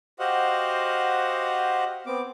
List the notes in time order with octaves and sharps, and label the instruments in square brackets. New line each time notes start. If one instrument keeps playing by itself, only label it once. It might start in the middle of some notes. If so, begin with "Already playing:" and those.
[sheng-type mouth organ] F#4 G4 C5 D#5 F5 F#5
B3 C4 D6